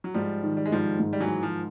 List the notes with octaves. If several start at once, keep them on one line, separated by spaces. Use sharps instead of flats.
F#3
G#2 F3 G3
D#3
G3
G#3
G#2 F3 G3
G#2
G3
E3 F#3
G#3
F3